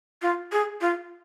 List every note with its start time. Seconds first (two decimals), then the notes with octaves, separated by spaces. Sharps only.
0.22 F4
0.52 G#4
0.81 F4